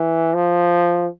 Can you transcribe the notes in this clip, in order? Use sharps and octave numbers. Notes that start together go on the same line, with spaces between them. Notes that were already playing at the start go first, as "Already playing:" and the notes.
Already playing: E3
F3